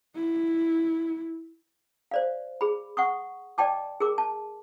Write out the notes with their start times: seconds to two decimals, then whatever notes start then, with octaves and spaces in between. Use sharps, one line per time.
0.15 E4
2.11 C5 D5 F5
2.61 G#4 B5
2.97 F#5 C#6 D#6
3.58 D5 D#5 G5 A5 D6
4.00 G#4 A#4 D6
4.18 A5